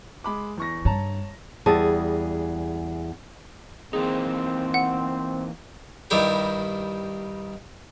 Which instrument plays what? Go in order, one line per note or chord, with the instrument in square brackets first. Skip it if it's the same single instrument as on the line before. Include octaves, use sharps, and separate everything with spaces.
[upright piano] G#3 B5 D6
E2 C#6 A#6
[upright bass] G2 [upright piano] C#5 A5 A#5
[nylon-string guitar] E2 G3 G#4 A5
[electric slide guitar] E3 A#3 D#4 [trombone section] C4 [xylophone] G#4
[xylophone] F#5
[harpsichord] G2 D#3 G3 E4 G4 D6